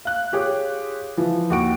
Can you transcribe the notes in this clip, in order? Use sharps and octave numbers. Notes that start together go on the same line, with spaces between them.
F5 F#6
F4 G4 G#4 C#5
E3 F3
D#2 F#4 D7